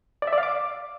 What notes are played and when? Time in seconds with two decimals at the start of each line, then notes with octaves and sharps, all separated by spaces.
0.22 D5
0.27 E5
0.33 D5
0.38 F5
0.43 D6